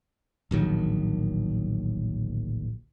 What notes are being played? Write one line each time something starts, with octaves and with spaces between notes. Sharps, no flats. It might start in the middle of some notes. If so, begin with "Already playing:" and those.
D1 A#1 D#3 F#3